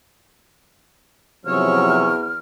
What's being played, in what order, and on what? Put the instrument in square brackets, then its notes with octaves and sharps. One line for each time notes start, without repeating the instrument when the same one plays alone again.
[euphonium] E2 [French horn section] C3 F3 F#3 [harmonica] C#4 C#5 E6 [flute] F6